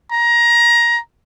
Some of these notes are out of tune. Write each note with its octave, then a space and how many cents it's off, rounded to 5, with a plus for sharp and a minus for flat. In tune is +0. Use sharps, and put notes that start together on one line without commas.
A#5 +20